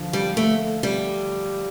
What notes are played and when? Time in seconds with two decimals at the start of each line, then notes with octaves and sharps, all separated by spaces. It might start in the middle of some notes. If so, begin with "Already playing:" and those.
Already playing: D3 F3
0.13 G3
0.37 A3
0.83 G3